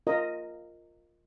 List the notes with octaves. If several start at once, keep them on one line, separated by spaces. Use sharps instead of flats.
F4 A#4 D#5